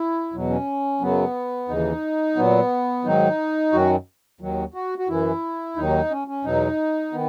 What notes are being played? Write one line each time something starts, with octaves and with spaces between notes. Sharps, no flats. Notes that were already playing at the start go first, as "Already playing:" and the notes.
Already playing: E4
E2 B2 F#3
C#4
F#2 C#3 F#3 B3
D#2 C#3 E3 D#4
A#2 F#3 B3
G#2 D#3 F#3 D#4
F#2 D#3 F#3 F#4
D#2 D#3 F#3
F#4
F#4
F#2 E3 E4
D#2 D#3 F#3 D#4
C#4
C#4
E2 B2 F#3 D#4
D#3 B3